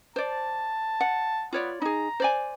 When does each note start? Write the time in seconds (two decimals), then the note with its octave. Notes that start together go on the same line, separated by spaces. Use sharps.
0.16 C5 D5 A5
1.01 F#5
1.53 B3 F4 C#5 D5
1.82 D#4 G#4 A#5
2.20 C5 D5 G#5